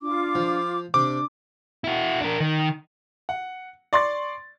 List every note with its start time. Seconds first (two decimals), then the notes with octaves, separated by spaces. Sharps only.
0.01 D4 F4 D6
0.35 F3
0.94 C3 D4 D6
1.84 E4 F#4
2.21 D4 A#4
2.40 D#3
3.29 F#5
3.93 D5 C6 C#6 A6